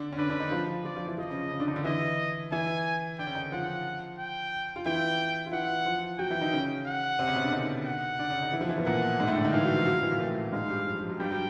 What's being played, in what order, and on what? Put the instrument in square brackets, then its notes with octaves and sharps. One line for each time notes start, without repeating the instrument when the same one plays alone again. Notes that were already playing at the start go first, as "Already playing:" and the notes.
Already playing: [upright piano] D3 D4
C#4
[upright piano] D3 D4 [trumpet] B4
[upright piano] D3 D4
D#3 D#4
F3 F4
[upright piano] F3 F4 [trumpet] D5
[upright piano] F3 F4
E3 E4
[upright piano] F3 F4 [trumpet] D#5
[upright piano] C#3 C#4
C#3 C#4
D3 D4
D#3 D#4
D3 D4
[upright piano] E3 E4 [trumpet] D#5
[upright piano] E3 E4 [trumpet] G#5
[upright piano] D3 D4 [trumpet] G5
[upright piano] C#3 C#4
D#3 D#4
[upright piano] F3 F4 [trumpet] F#5
[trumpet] G5
[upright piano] F4
[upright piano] E3 E4 [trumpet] G5
[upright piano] F4
[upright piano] E3 E4 [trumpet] F#5
[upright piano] F3 F4
[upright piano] F#3 F#4 [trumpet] G5
[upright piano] E3 E4
D#3 D#4
C#3 C#4
[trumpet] F#5
[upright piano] C3 C4
C#3 C#4
B2 B3
D3 D4
D#3 D#4
[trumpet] F#5
[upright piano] D3 D4
C#3 C#4
D#3 D#4
E3 E4
F3 F4
E3 E4
B2 B3
[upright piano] A#2 A#3 [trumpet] F#5
[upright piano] G#2 G#3
A2 A3
D3 D4
D#3 D#4
[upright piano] E3 E4 [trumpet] F5
[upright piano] F#3 F#4
F3 F4
F#3 F#4
F3 F4
E3 E4
A#2 A#3
A2 A3
[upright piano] G#2 G#3 [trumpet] F5
[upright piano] G2 G3
F3
F3
F#3
[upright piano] G2 G3 [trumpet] G5
[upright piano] F#3